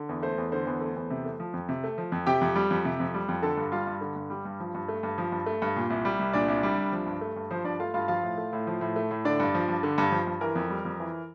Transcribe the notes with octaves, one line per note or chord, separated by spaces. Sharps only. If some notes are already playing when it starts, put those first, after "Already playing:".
Already playing: D3
E2
A3 C5
E2
D3 C5
E2
A3
E2
C3
A3
F3
F2
C3
A3
F3
F2
C3 G4 G5
F2
G3
F2
C3
F2
G3
F2
D3 A4 A5
G2
G3 F4 F5
G2
D3
G2
G3
G2
F3
G2
A3
G2
F3
G2
A3
G2
A#2
C2
G3
C2
A#2 D4 D5
C2
G3
C2
F3
G2
A3
G2
F3 C5
G2 D4 D5
A3 F4 F5
G2 F4 F5
F3 F4 F5
A2
A3
A2
F3
A2
A3
A2
D3 D4 D5
G2
F3
G2
D3
G2
F3
G2
E3 A#4
F2
G3
F2
E3